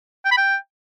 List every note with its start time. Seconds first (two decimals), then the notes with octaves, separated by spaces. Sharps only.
0.25 G5
0.31 B5
0.37 G5